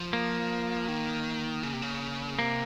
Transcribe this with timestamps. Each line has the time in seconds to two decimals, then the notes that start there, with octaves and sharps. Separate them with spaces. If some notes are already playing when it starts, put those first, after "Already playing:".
Already playing: F3
0.13 A#3
0.88 D#3
1.63 C#3
1.73 C3
1.82 C#3
2.39 C3 A#3